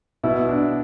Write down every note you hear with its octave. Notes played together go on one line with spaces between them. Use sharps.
B2 E4
D4